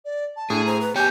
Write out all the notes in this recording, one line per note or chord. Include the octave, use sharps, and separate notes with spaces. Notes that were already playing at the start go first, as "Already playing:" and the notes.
D5
A5
A2 D4 G#4
C5 A#5
B4
B3 G4 C#5 G5 G#5 G6